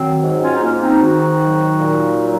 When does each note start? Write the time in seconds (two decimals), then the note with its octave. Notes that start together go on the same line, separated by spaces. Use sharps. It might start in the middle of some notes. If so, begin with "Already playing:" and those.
Already playing: D#3 F#3 C4
0.23 G#2
0.42 C#4 F4
0.54 D#4
0.61 G#2 A#3 C#4
0.81 C4 D#4
1.01 D#3 D#4 F#4
1.40 F#3
1.79 A#2
2.18 F#3